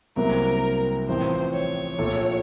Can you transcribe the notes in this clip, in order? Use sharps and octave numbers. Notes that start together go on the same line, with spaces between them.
C2 C3 F#3 A#3 A#4
A1 A2 F3 C4 C5
C#5
A#1 A#2 A3